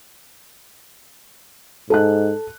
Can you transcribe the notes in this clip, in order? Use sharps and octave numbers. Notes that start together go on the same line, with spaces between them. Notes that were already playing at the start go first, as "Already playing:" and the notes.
G#2 A4 A5 F#6